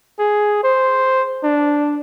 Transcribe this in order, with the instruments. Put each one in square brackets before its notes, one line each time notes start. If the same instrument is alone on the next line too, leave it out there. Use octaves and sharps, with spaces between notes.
[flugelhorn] G#4
C5
D4